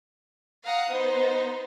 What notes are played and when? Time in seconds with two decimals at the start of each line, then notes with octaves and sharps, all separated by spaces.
0.63 F5 F#5 A#5 D#6
0.91 B3 D#4 C5